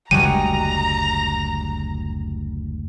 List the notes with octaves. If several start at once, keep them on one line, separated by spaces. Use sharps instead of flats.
F#1 D2 G3 G#3 F#4 A#5 D#7